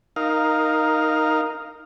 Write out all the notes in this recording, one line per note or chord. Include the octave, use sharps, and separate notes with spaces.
D#4 A#4 F5